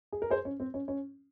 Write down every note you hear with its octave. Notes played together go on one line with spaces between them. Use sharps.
G#4
A#4
G#4 C5
C#4
C4
C#4
C#4